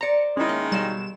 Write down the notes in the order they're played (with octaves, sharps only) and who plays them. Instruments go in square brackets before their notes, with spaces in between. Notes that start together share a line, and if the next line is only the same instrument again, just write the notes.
[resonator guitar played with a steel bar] C5 D5 [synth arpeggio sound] A#5 C#7
[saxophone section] D#3 G#3 [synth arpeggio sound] C#4 E4
[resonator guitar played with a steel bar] A#3
[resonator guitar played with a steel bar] B2 F#3 F5 [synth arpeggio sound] G3 E7